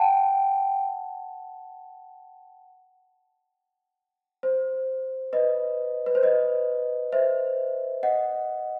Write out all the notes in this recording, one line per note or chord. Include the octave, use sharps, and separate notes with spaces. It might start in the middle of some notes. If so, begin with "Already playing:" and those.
Already playing: F#5 G5 A5
C5
B4 D#5
B4
C5
B4 D#5
C5 E5
D#5 F#5